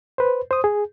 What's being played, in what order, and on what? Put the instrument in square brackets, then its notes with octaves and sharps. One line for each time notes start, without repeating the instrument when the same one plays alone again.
[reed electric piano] B4 C5
C5 D#6
G#4